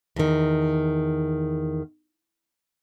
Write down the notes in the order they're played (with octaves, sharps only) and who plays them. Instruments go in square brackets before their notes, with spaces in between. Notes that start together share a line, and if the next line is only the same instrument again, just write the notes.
[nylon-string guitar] E2 D#3